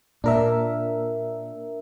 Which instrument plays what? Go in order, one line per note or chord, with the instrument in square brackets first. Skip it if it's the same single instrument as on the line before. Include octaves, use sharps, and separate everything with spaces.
[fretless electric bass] A#2 [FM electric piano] D4 A#4 E5